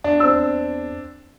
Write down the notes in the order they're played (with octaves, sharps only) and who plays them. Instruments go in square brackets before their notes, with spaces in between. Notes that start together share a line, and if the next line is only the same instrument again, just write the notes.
[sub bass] E2 [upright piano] D4
[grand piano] C4 E6